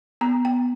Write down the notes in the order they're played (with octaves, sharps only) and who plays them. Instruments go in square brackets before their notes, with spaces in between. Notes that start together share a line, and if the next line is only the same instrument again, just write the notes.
[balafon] B3 A#5
B3 G5